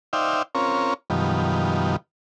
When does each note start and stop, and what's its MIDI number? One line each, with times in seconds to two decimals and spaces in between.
0.13 0.42 63
0.13 0.42 72
0.13 0.42 74
0.13 0.42 76
0.13 0.42 77
0.13 0.42 79
0.55 0.94 60
0.55 0.94 61
0.55 0.94 65
0.55 0.94 70
0.55 0.94 73
1.10 1.96 42
1.10 1.96 47
1.10 1.96 51
1.10 1.96 53
1.10 1.96 55